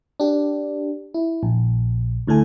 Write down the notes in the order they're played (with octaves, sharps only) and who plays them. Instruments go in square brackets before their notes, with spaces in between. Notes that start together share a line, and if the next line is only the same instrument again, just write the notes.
[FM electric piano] D4 G4
E4
A#1
D2 A2 A3 A4 G#5